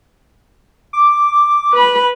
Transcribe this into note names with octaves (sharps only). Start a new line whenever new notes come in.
D6
B4 B5